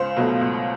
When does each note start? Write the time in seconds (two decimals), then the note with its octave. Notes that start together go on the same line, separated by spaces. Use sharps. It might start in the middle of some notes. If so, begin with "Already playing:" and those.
Already playing: C#2 C5
0.16 B2 F#3 A3
0.41 C#2